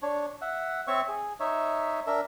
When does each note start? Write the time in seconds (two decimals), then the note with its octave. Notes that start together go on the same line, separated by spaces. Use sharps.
0.02 D4 C#5
0.41 E5 F#5
0.87 C4 C#5 E5 C#6
1.08 G#4
1.40 D#4 C#5 E5
2.07 D4 A#4 E5